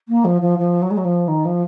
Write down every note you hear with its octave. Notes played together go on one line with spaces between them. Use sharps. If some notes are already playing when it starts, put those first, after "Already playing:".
A#3
F3
F3
F3
F#3
G#3
F#3
F3
D#3
F3